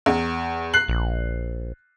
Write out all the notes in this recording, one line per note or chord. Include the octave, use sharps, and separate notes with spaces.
E2
F#6 C7 F#7
A#1